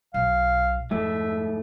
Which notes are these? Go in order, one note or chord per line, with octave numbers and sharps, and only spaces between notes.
B1 F5
F2 G#2 A3 E5